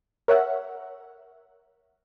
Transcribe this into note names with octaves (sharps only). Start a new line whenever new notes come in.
A#4 C#5 E5 F#5